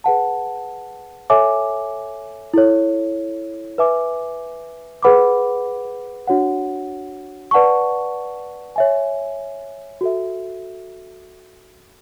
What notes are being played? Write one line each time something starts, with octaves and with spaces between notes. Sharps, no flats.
G#4 B4 F#5 A5
A4 C#5 E5 G#5 D6
E4 A4 C#5
B4 E5 G#5 D6
G#4 B4 F#5 B5 D6
D4 F#4 C#5 F#5
B4 D5 F#5 A5 C#6
C#5 E5 G#5
F#4 A4 E5